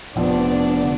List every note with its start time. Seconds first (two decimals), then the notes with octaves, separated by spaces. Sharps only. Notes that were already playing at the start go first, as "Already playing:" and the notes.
0.16 F1 F2 F3 B3 D4 D5
0.83 D3